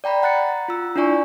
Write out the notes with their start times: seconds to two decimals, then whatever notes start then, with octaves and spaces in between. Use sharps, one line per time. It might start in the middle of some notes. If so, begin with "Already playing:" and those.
0.04 D5 G5 A#5 B5
0.23 F#5 A#5 F#6 A6 C#7
0.68 F4 E6
0.96 D4 E4 F4 D5 G#5 C#6